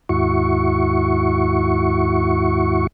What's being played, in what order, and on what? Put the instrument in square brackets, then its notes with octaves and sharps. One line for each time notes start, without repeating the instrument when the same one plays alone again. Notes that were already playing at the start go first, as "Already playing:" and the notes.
[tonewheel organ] D#2 G#2 E4 F#4 C#6